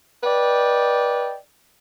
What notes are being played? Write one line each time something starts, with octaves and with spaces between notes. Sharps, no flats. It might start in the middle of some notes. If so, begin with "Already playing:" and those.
B4 D5 D#5 G5